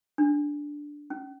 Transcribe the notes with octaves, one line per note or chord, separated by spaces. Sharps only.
D4
C#4